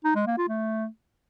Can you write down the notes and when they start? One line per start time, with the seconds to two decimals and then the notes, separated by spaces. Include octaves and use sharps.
0.04 D#4
0.15 G#3
0.26 A#3
0.37 F4
0.48 A3